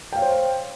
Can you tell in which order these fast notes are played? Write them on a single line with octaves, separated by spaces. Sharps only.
G5 F5 C#5 C5